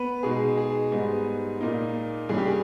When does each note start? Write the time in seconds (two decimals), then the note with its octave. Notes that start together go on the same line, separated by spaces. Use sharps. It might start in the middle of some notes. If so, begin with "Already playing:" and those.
Already playing: B3 B4
0.23 B2 G#3 D#4 G#4
0.57 G#4
0.92 G#2 G3 B3 D#4
1.61 A#2 A#3 D#4
2.29 G2 E3 G3 C#4 G#4
2.38 G4
2.47 G#4